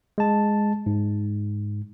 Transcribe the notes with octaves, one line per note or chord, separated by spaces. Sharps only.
G#3 A5
G#2